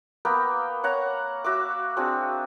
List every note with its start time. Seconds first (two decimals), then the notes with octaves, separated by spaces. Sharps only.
0.25 A#3 B3 G5
0.84 C#5 F#5 A#5
1.44 F#4 E5 D6
1.97 C4 D4 F#4 G#4